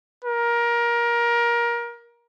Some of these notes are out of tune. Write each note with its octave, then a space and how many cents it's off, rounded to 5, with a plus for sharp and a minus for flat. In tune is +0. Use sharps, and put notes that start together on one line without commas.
A#4 +20